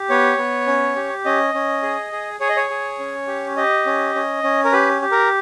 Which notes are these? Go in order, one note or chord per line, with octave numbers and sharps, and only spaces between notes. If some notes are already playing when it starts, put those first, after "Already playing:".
Already playing: G4
B3 C#5
B3
C#4
G4
C#4 D#5
C#4
G#4
G#4
G#4 C#5
D#5
C#5
G#4
C#4
G4
G4 D#5
C#4
C#4
C#4
A#4
G4 B4
G4
A#4